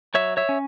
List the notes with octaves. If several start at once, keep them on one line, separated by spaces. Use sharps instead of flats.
F#3 C#5 E5
C#5 E5
C#4